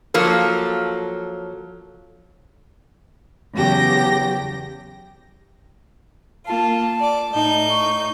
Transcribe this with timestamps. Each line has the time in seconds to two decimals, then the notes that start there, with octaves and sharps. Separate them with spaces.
0.14 F3 F#3 A#3 A4
3.53 E2 C#3 F#3 G4 G5 A#6
6.47 A#3 F4 A5
6.99 D5 D6
7.32 A2 D#4 G6
7.70 C#6